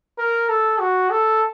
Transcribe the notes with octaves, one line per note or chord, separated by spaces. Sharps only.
A#4
A4
F#4
A4